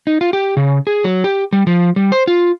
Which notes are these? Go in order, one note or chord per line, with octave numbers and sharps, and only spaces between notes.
D#4
F4
G4
C#3
G#4
F#3
G4
G3
F3
G3
C5
F4